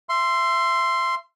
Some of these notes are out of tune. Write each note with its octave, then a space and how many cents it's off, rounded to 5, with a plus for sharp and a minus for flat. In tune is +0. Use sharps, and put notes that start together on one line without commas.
E5 +30 C6 +0